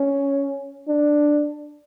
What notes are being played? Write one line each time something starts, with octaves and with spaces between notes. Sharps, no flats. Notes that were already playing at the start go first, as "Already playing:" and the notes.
Already playing: C#4
D4